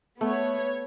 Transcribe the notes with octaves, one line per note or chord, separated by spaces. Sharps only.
A3 B3 C#5